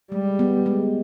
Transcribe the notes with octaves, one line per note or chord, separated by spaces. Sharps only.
G3 G#3
B3
G#3